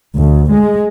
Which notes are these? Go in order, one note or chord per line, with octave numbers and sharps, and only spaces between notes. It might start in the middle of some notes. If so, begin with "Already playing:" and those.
D2
G#3